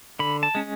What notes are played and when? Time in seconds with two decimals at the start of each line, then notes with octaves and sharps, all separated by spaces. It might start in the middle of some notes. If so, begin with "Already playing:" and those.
0.19 D3 B5
0.43 A5
0.55 G#3 C#4